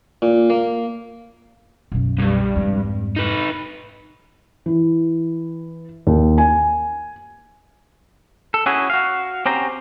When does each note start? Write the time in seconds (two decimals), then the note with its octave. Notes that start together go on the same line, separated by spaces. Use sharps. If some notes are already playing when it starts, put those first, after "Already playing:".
0.22 A#2
0.50 A#3
1.92 B1 F#2
2.18 C2 G2
2.56 F2 G#2
3.16 D#4 B4
4.66 E3
6.07 D#2
6.38 G#5
8.54 A4
8.66 C#4 E4 F#4 G#4
8.90 F#4 F5
9.46 C4 C#4 G4 C5 A#5